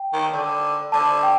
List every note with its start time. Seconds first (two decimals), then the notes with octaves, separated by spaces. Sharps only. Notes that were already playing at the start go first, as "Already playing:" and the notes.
Already playing: G5
0.13 D#3
0.33 D3
0.92 D3 A5
1.23 G5